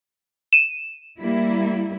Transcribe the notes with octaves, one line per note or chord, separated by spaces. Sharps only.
D#7 E7
G3 A#3 E4